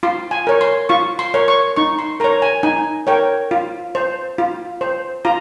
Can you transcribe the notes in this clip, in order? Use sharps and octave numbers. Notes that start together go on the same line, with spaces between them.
F4 C6
G#5
A#4 C#5
C6
F4 C#6
C6
A#4 C#5
C#6
D#4 C#6
C6
A#4 C#5 A#5
G#5
D#4 G#5
A#4 C#5 G5
F4
C5
F4
C5
F4 A#5